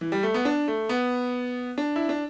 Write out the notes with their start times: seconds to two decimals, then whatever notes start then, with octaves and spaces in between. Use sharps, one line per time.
0.01 E3
0.12 G3
0.23 A3
0.34 B3
0.45 D4
0.68 A3
0.89 B3
1.78 D4
1.96 E4
2.09 D4